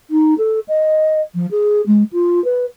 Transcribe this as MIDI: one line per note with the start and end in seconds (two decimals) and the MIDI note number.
0.10 0.34 63
0.38 0.59 69
0.68 1.21 75
1.34 1.46 53
1.51 1.81 68
1.86 2.03 56
2.12 2.43 65
2.44 2.65 71